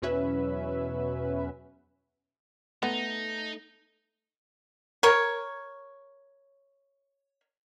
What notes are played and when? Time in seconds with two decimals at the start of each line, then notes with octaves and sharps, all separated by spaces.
0.02 E2 B2 F#3 C#4 B4 E5
2.83 A3 B3 D#4
5.03 A#4 C#5